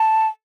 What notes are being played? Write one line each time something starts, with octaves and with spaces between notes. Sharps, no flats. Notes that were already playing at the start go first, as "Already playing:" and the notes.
Already playing: A5